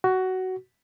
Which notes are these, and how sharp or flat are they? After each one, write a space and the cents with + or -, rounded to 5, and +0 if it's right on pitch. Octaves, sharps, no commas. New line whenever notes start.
F#4 +15